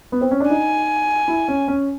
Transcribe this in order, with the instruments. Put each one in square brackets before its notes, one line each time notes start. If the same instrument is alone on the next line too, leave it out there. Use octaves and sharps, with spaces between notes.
[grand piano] B3
C4
C#4
D4
[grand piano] D#4 [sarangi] G#5
[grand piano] E4
C#4
C#4